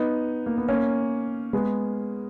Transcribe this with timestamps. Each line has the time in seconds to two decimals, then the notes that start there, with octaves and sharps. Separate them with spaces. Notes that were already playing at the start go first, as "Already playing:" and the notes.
Already playing: B3 D#4
0.46 A#3
0.58 B3
0.69 A#3 C#4
1.53 G#3 B3